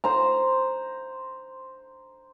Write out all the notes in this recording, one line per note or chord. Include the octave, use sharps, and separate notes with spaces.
C5 A#5